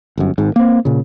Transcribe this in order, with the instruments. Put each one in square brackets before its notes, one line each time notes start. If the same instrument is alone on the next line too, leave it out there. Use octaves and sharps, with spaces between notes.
[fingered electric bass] G1 F#2
G#1 G#2
A#3 C4
A#2 C#3